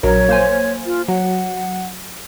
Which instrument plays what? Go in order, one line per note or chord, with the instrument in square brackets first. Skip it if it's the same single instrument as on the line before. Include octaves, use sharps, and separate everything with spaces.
[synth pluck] A#1 F#3 A#4 [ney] C#5
[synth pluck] A#3 C5 G#5
[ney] F4
[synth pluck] F#3 [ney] F#5